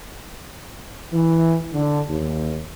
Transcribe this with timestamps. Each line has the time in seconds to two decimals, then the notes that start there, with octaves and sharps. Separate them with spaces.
1.13 E3
1.74 D3
2.08 D#2